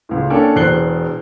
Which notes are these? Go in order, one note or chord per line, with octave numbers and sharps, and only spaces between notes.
C#2 A2
A#3 C#4 D4 A4 D5 G5
E1 E2 C5 F#6 C7 G7